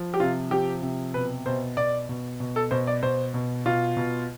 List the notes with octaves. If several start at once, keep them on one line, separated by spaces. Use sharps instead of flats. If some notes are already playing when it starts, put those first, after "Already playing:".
Already playing: F3
G4
C3 F4
F3 G4
C3
B2 B4
B2 C5
B2 D5
B2
B2
A4
B2 C5
D5
B2 C5
B2
B2 F4
B2